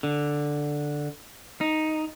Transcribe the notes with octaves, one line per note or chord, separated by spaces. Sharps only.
D3
D#4